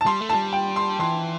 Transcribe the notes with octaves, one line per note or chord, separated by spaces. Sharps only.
A5
G3 C6
A3
G3 A5
G5
C6
E3 C6